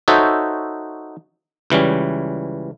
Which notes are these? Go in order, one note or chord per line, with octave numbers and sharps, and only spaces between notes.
D#4 F#4 A4 C5 C#5 E5
C#2 E3 G3 C#4